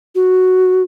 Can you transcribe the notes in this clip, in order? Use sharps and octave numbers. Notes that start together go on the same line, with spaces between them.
F#4